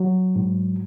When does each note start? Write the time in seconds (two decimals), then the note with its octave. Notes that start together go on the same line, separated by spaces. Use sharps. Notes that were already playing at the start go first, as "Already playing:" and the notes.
Already playing: F#3
0.36 G#2